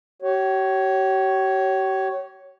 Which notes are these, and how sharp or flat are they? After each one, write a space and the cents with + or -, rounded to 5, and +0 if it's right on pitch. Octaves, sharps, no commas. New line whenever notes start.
G4 -45 C#5 +0